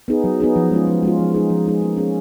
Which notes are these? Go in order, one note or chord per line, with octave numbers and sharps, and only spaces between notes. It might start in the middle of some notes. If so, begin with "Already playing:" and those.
B3 D#4 G#4
F#3
B3 D#4 G#4
F3
G#3 C#4 F4
F3
G#3 C#4 F4
F3
G#3 D#4 G#4
F3
G#3 D#4 G#4
A#3
C#4 G#4